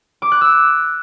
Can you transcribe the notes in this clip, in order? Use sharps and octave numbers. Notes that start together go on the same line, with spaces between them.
D6
F#6
E6